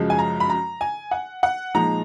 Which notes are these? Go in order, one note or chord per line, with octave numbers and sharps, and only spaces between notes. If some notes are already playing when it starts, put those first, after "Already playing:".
Already playing: F#2 C#3 F3 G#3
G#5
A#5
B5
A#5
G#5
F#5
F#5
A#2 F3 G#3 D#4 A#5